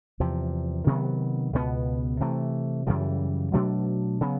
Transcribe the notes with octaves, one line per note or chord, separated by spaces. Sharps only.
E2 C3 F3
C3 D#3 F#3 B3
C#2 B2 F#3 B3
C3 E3 A3
F#2 C#3 E3 G3
B2 F#3 A3 D4
C#3 F#3 B3